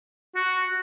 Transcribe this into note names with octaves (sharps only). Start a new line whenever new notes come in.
F#4